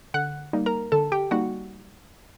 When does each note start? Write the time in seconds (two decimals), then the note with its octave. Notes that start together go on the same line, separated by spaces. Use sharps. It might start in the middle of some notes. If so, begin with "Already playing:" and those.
0.14 D3 F#5 F#6
0.53 G3 A#3 D#4
0.66 A#4 A#5
0.92 D3 A4 A5
1.12 G4 G5
1.31 G3 A#3 D#4 F#4 F#5